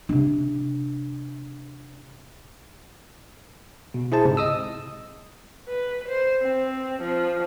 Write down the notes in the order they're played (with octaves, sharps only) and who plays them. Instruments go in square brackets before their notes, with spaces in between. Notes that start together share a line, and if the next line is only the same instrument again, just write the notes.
[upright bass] C3 D4
[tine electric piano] B2
E4 G#4 C5 A5
C#2 G#2 C3
D#5 D#6 E6
[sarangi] B4
C5
C4
F3